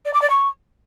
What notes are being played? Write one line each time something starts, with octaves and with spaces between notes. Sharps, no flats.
D5
D6
D5
C#6